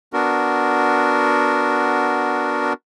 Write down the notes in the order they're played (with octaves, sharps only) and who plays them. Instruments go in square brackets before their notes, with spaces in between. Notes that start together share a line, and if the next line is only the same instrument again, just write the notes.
[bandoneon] B3 D4 F#4 A#4